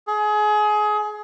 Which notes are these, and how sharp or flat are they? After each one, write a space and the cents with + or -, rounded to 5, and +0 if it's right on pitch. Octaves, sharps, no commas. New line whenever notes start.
G#4 +25